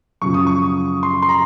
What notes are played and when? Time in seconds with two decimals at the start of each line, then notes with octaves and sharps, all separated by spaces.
0.22 F#2 C#3 F3 C#6
0.34 D#6
0.47 C#6
1.03 C6
1.22 C6
1.29 A#5